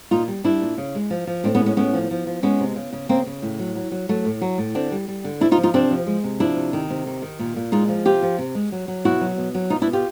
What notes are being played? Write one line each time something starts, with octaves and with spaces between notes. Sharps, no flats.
A#2 D#4 F4
G3
G3 D4 E4
A#2
C#3
G#3
F3
F3
A2 C4 D4
B3 C#4
G#3
B3 C#4
A2 B3 C#4
F3
F3
F3
G#3 B3 C#4
C3
C#3
C#3
C#3 A#3 C4
C#3
A2
F#3
F#3
F#3
F#3 A3
A2
F#3
A2
D3 C4 D4
G3
G3
D3
C3 D4 E4
D#4 F4
F3
D#4 F4
C3 C4 D4
F3
G#3
C3
F3 D4 E4
C3
D#3
C3
D#3
D#3
A#2
A#2
G#3 D#4 F4
F3
C3 F4 G4
F3
C3
G#3
F#3
F#3
B2 E4 F#4
F#3
B2
F#3
B2 D#4 F4
D4 E4
B2
F4 G4